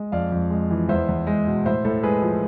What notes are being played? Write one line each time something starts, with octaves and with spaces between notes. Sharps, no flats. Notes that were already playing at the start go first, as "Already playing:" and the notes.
Already playing: G#3
F2 D5 F5
F2
G#3
E3
E2 C5 E5
E2
G#3
B2
A2 C5 E5
A2 A4 C5
G#3 G#4 B4
F3